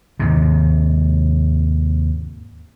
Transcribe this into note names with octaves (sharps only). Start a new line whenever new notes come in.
D#2 G#2 C3